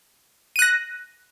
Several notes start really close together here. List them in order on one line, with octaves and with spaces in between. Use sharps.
D#7 F#6 A#6